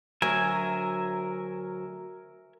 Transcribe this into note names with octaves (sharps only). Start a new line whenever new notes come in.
D2 F#3 A#4 E5 G#5